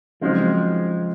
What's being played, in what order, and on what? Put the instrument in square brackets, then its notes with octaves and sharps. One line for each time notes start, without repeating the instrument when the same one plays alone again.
[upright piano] C#3 F#3 C4 D#4 [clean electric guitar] F3 G#3